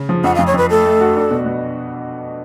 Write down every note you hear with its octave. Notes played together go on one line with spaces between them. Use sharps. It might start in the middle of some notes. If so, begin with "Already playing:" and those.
Already playing: C#3
F3
F2 F#5
F5
F2
C#5
F2 B4
A3 A4
A3
F#4
D4
B2
B2